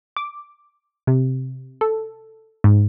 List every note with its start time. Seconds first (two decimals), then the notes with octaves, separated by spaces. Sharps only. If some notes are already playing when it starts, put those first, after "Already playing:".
0.17 D6
1.07 C3
1.81 A4
2.64 G#2